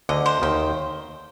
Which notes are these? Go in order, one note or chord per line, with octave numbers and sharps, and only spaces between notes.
D2 D3 D#5
C5
D#2 D#3 G5